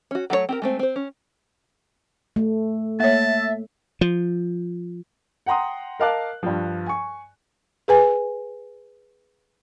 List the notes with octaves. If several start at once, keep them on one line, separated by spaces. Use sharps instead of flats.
C#4 F#4
F#3 A3 G#4 C#5
C4 G4 A#4
G#3 A3 C4
C4 C5
C#4
A3
A#3 C#5 E5 A5
F3
F#5 G5 A#5 C6 D#6
A#4 D#5 F5 A5 D6 F#6
G2 F3
G#5 C#6
G#4 B4 G#5